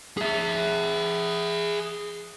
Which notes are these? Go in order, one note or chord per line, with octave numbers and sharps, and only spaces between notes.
G#4 E5